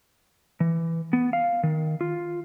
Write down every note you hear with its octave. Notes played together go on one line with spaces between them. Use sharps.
E3
B3
F5
D#3
F4